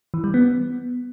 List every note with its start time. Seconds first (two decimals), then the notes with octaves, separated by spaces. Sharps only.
0.14 E3
0.24 G3
0.34 B3